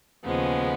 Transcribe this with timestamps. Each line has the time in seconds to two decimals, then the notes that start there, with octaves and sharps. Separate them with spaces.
0.23 D#2 C#3 F3 G#3 B3